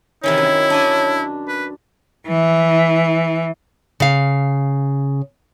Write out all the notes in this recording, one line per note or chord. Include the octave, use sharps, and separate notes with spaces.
C3 D#3 E3 E4 C#5
F#2
D4 D#5 G#5
B4
E3
C#3 F5